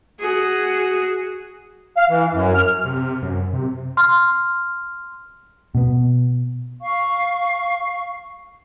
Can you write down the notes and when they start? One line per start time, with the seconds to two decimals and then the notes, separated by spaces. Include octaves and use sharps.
0.20 F#4 G#4
1.97 F5
2.10 E3
2.34 F#2
2.55 F6
2.85 C3
3.22 F#2
3.53 C3
3.97 C6 F6
5.75 B2 B3
6.80 F5 C#6